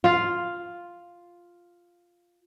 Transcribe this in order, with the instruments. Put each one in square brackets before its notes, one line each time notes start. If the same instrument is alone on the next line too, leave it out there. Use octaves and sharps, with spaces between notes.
[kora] F4 F5